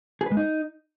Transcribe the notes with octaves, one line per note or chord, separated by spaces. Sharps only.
G#4
B4
G#3
D#4